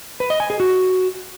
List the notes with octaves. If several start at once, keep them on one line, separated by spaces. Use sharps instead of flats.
B4
D#5
G#5
G#4
F#4